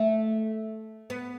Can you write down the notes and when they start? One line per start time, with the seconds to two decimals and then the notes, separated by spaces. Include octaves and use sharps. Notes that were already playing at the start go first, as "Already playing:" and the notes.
Already playing: A3
1.10 B3